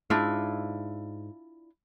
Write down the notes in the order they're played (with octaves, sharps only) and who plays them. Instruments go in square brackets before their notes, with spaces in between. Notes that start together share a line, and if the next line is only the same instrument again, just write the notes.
[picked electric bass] G#2 [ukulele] D4 E4 F4